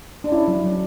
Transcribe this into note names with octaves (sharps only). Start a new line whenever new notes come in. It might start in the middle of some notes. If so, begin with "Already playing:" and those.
D4
C#4 E4
F#3
F#3